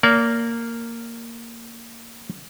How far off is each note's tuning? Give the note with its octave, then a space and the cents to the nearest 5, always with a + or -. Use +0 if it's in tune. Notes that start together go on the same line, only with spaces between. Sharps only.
A#3 -10 D5 -40